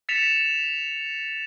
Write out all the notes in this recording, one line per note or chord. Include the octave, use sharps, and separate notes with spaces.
A6 B6 C#7 E7 F7